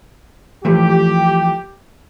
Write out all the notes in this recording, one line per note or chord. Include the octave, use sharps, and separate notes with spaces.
E3 F3 A3 G4